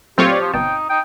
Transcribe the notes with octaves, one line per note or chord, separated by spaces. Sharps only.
A#2 F#3 A3 C4 F4 G4 C#5
D5
F3
G1 B2 D#4 G5 A5
D#4 G5